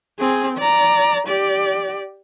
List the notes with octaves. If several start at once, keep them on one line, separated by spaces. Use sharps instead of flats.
C4 G#4
D5 A#5
G4 D5